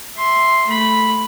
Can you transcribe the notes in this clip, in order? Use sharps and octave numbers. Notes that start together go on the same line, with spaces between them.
E5 C6
A3 B5